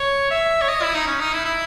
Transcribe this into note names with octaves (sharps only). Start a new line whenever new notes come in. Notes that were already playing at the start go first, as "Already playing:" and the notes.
Already playing: C#5
E5
C#5
D#5
E4
D#4
C#4
D#4
E4
E4